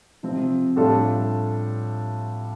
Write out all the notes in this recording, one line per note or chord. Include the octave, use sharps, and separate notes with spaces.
C3 F3 C4
A2 G3 D4 F4 A4